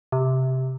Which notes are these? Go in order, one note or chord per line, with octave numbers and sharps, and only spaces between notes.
C3